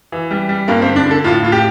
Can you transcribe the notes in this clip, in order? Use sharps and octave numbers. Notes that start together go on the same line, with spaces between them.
E3
G3
G3
G2 A#3
C4
D3
D4
D3 A4
A2 F4
A2 F4
G4